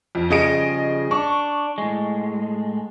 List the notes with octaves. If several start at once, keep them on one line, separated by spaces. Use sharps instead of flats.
F2
C#3 F3 G3 G#4 D#5 D7
D4 C#6
A2 G#3